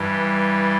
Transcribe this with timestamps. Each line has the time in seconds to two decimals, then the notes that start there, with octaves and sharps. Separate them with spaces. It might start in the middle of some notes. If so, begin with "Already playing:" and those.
Already playing: G2 E3 G3